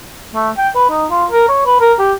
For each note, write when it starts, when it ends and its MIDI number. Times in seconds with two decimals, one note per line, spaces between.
0.35 0.50 57
0.58 0.68 79
0.75 0.85 71
0.90 1.05 63
1.11 1.25 65
1.31 1.46 70
1.49 1.64 73
1.66 1.78 71
1.80 1.94 70
1.99 2.13 67